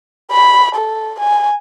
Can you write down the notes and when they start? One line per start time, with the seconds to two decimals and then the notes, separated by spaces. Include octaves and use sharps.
0.31 B5
0.75 A4
1.20 G#5